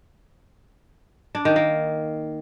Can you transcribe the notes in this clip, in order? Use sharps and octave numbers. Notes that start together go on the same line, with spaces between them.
D4
D#3
A#3